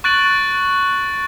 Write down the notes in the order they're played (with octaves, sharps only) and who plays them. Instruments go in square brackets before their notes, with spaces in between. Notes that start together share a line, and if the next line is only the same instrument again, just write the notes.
[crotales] C#6 F#6 A6 D7 F#7